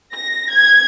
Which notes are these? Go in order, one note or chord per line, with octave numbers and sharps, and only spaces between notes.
A#6
G#6